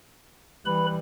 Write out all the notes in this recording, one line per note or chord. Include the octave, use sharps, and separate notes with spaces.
E3 G3 B4 B5